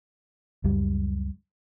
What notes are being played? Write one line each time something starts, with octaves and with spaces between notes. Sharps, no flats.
C#2 F#2 G3